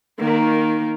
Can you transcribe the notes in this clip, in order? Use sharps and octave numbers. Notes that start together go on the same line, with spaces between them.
D#3 A#3